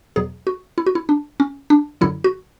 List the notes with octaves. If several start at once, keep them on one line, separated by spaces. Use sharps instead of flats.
E2 B2 F#3 G#4
F#4
E4
F#4
E4
D4
C#4
D4
F#2 D3 F#3 E4
F#4